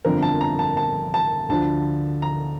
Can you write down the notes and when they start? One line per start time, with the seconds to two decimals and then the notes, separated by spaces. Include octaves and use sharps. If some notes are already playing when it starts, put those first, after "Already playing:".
0.05 G1 F2 D3 F3 A#4
0.23 A5
0.41 A#5
0.59 A5
0.77 A5
1.14 A5
1.49 D2 D3 F3 A5
2.22 A#5